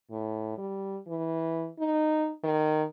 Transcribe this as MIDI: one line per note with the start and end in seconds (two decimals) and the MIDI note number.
0.11 0.55 45
0.58 0.99 55
1.07 1.68 52
1.79 2.33 63
2.44 2.85 51